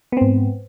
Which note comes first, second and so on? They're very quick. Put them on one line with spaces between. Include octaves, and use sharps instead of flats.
B3 C4 G#2